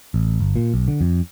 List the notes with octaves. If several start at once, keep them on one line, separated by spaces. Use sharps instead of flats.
A1
G1
A#2
B1
D3
F2